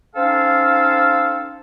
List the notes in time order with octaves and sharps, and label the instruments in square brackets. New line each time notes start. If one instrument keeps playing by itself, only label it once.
[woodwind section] C4 C#4 D#4 A4 F5